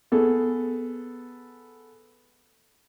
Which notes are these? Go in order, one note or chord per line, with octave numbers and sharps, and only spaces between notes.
B3 G#4 A4